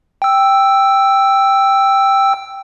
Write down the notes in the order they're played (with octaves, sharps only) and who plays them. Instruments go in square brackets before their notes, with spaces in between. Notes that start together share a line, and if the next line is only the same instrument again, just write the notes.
[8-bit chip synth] G5 E6